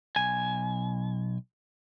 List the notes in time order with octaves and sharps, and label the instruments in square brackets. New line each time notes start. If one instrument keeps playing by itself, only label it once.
[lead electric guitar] B1 G#5